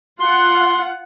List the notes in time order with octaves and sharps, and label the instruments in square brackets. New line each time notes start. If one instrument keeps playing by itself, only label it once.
[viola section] F4 F#5 [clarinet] C6